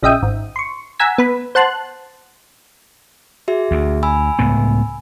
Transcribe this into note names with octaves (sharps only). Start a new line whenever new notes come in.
A#1 C#3 D#5 E5 G5 D#6
G#1
C6 C#6
F#5 G#5 A#5 E6 G#6 B6
B3 B5
C5 F#5 A5 C6 F#6
F#4 G#4 E5
D2
G#5 B5 E6
C#2 A2 B3